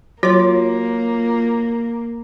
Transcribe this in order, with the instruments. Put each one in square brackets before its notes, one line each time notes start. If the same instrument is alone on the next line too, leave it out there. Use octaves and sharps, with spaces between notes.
[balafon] F#3 [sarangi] A#3 [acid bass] F4 [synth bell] F#4 C#5